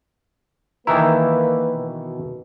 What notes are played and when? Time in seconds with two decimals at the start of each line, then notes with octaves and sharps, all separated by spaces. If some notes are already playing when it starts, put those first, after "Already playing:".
0.87 D#3 E3 A#3 E4 B4 A5 A#5
1.75 B2